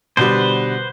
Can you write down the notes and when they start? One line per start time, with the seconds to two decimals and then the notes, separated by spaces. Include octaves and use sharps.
0.17 B2 D3 G3 B4 C5